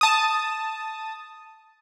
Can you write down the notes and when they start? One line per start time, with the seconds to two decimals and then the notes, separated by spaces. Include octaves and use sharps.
0.01 A5 D#6